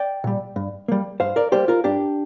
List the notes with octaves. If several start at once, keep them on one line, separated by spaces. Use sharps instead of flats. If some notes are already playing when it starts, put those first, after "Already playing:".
Already playing: D5 G5
A#2 G3
G2
G3 A#3
G2 C5 F5
A#4 D5
G3 A#3 G4 C5
F4 A#4
G2 D4 G4